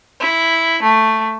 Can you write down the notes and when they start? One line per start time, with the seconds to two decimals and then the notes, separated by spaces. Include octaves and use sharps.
0.19 E4
0.82 A3